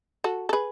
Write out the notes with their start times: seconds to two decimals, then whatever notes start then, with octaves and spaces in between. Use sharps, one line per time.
0.24 F#4 A4
0.49 A4
0.53 G#4 B4